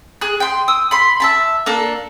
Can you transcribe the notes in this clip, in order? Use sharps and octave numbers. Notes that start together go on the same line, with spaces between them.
G#4 F#6
G5 C6
D#6 E6
B5 C6
E5 A5 B5
A#3 D4 A4